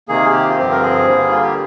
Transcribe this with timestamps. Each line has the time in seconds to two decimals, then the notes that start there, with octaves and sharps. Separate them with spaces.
0.08 C3 D#3 A#3 G#4
0.32 G4
0.48 F4
0.57 G2 D3 F3 C4 G4
0.71 A#4
0.82 G#4
1.06 D3 G3 A#3
1.31 F4
1.43 G4